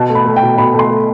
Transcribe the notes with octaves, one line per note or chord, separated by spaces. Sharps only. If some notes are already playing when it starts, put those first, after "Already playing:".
Already playing: B2 A5
A3
B5
A3
G5
B2
B2 B5
A3 C6
A3